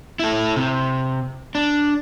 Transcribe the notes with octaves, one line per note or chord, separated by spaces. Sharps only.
E4 A4
C3
D4